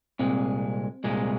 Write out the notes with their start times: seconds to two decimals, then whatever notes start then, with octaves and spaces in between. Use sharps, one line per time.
0.19 C2 A#2 G#3 C4
1.04 C2 A#2 G#3